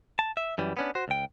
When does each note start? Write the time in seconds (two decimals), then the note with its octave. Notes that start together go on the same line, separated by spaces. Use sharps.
0.19 A5
0.37 E5
0.58 F#2 E3 G3
0.77 B3 C#4 D4
0.95 F#4 C5
1.08 C#2 G5